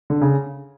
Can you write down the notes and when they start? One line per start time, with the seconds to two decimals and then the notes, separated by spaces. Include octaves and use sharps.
0.10 D3
0.21 C#3